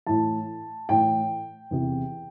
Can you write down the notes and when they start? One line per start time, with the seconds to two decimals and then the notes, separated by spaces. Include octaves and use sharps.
0.07 A2 E3 A5
0.89 A2 E3 G5
1.71 E2 C3 E3